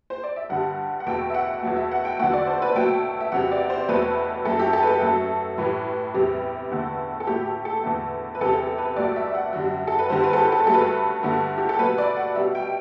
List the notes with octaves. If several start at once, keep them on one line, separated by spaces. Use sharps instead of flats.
C5
D5
E5
G2 D3 G3 F#5
F#5
E2 B2 A3 G5
E5
F#5
E2 B2 F#3 A3
E5
F#5
G5
E2 D3 F#3 A3 F#5
D5
C5
B4
B2 F#3 A3 G5
E5
E2 C3 F#3 F#5
D5
C5
E2 B2 F#3 A3 B4
F#2 F#3 A3 A4
G4
A4
B4
A4
F#2 F#3 A3 A4
A2 E3 G3 B4
E2 C3 G3
E2 D3 A3
A4
A2 F#3 A3 G4
G4
A4
E2 D3 A3
B4
E2 C3 G3 A4
A4
B4
G2 F#3 A3 D5
E5
E5
F#5
F#2 D3 G3
A4
B4
G2 D3 G3 C5
B4
A4
G4
A4
G2 F#3 A3 A4
B4
A4
G2 D3 A3
G4
A4
B2 F#3 A3 B4
D5
F#5
B2 G3 E5
G5